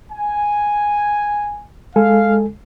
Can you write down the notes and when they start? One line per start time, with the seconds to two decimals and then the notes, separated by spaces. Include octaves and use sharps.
0.12 G#5
1.96 G#3 A4 F5 G#5